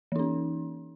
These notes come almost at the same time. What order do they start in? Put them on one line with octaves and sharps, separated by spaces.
E3 D#4 C#4